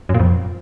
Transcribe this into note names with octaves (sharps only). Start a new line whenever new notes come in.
F#2
A#2
F2